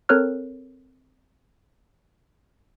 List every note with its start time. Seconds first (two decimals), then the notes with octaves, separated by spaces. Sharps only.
0.09 C4 A4 A#4 C#5 F6 F#6